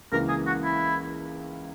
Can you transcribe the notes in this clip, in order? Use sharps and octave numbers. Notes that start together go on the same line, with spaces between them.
C#2 C#3 E3 A#3 A#4
G#4
F#4
E4